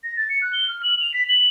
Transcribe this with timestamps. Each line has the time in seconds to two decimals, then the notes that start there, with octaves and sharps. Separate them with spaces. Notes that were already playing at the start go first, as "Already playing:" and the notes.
0.03 A#6
0.17 A6
0.29 C#7
0.41 F#6
0.53 G7
0.68 F6
0.83 F#7
1.00 F7
1.13 B6
1.28 F#7